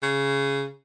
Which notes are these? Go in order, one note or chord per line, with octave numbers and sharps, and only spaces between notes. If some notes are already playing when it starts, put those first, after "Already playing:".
C#3